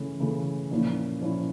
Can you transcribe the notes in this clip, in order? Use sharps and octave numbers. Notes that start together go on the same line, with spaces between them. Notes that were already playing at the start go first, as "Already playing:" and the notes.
Already playing: C#3 E3 A3 C#4
C#3 E3 A3 C#4
A#2 F3 A#3 C#4 E4
A#2 F3 A#3 C#4 E4